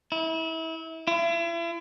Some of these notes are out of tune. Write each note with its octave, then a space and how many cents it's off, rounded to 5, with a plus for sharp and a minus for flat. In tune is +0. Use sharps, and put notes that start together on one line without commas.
E4 -30
E4 +40